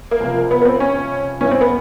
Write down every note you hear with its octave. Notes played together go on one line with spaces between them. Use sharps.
A#3
C#2 C3 F3
B3
B3
C4
C#4
G2 E3 C#4
C4
B3